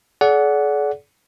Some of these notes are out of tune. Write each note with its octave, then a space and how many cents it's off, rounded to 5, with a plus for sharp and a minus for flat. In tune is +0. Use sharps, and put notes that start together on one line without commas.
G#4 +45 D5 -30 F#5 +0